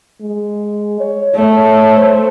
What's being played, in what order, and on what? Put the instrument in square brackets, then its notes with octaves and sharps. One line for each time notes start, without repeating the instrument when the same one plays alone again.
[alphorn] G#3
C#5
[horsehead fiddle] A3 [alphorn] C#5
[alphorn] C5